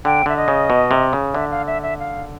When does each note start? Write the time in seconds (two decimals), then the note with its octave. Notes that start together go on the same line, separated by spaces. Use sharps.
0.05 D3 G5
0.26 D3 E5
0.37 D#5
0.48 C#3
0.70 B2
0.91 C3
1.13 C#3
1.34 D3 E5
1.51 F5
1.67 E5
1.83 E5
1.99 F5